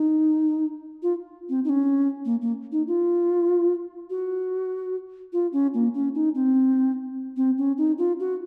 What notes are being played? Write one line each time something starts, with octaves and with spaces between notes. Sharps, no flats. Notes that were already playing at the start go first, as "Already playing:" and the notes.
Already playing: D#4
F4
C4
D#4
C#4
A#3
A#3
D#4
F4
F#4
F4
C#4
A#3
C#4
D#4
C4
C4
C#4
D#4
F4
F#4